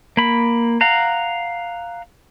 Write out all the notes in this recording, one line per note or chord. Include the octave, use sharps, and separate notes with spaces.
A#3 B5
F5 F#5 A#5